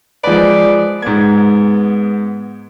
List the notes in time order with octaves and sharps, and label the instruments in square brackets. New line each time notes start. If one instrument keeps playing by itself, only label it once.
[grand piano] F3 G#3 B4 [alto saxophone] D5
[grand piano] G#2 G#6 [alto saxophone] B3